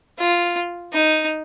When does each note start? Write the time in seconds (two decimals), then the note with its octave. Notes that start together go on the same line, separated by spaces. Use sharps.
0.19 F4
0.93 D#4